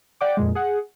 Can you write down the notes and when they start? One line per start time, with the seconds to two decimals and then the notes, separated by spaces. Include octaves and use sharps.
0.21 D5 F#5 G5 D6
0.37 F2 A#2 G#3
0.55 G#4 F#5